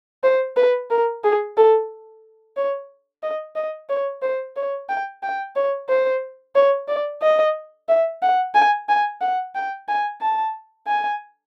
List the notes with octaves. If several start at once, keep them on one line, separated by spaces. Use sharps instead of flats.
C5
B4
A#4
G#4
A4
C#5
D#5
D#5
C#5
C5
C#5
G5
G5
C#5
C5
C#5
D5
D#5
E5
F#5
G#5
G#5
F#5
G5
G#5
A5
G#5